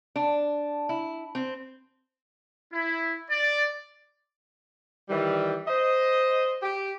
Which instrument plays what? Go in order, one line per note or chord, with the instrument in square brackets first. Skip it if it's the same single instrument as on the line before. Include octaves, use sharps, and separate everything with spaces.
[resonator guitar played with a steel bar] D4
E4
C4
[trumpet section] E4
D5
[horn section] D#3 E3 G3
C5 D#5
G4